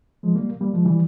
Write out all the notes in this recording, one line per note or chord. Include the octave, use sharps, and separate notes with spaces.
F3 G#3
G3 A#3
G3 A#3
F3 G#3
E3 G3